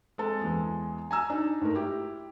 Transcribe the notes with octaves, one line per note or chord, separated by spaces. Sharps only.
G#3 C4 A4
E2 E3 G#3
G#5 A#5 E6
D4 D#4
G#2 A3 A#4
E4 G4